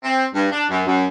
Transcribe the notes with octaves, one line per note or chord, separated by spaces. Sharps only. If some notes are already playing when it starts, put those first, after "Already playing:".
C4
G2
D4
F#2
F#2